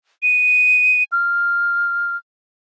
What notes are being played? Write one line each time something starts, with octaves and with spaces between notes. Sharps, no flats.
D#7
F6